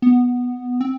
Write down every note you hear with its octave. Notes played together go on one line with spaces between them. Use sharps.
B3
C4